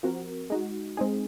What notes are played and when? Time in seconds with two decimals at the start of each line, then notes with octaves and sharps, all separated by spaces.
0.03 F3 C4 F#4 A#4
0.50 G#3 D#4 F#4
0.97 G#3 C4 D#4 G#4